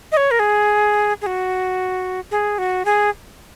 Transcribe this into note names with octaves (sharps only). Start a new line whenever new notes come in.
D#5
C#5
A#4
G#4
G#4
F#4
G#4
F#4
G#4